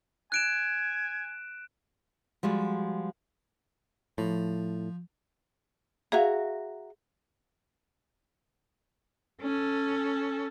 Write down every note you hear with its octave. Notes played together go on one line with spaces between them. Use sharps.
G#5 F#6 D7 E7
F3 G3 G#3 F#4
A2 F3
F#4 G#4 E5 F5 A#5
C#4 A4